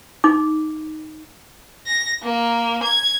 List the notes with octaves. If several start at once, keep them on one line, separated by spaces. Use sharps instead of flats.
D#4 D6
A#6
A#3
G#6